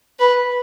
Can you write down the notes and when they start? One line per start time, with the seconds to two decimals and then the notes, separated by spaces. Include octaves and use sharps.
0.19 B4